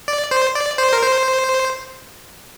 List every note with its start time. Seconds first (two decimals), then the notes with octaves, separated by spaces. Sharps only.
0.08 D5
0.31 C5
0.55 D5
0.78 C5
0.93 A#4
1.02 C5